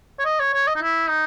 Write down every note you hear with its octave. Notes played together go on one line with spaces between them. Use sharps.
C#5
D#5
C#5
C#5
D#5
D#4
E4
D#4